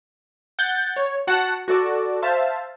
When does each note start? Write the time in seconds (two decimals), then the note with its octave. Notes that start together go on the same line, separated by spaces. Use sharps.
0.59 F#5 G6 A6
0.96 C#5
1.27 F#4 F#5 A5
1.68 F#4 A4 D5 A5
2.22 C5 E5 F5 A5